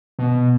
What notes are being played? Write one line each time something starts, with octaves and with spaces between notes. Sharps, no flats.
B2